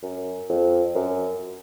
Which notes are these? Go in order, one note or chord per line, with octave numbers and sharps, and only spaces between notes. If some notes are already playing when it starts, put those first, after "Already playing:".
F#2
F2
F#2